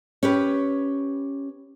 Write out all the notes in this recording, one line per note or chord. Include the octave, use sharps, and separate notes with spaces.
C#4 G4 B4